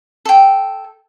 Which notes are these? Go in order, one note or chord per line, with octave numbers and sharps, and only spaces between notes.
A4 G5